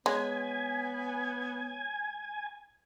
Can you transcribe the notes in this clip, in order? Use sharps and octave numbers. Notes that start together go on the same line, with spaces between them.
G#3 B3 C#5 G#5